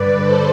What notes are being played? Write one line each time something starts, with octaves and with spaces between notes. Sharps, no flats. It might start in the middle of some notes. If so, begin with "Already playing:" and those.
Already playing: G2 D3 B4 D5
A4 C5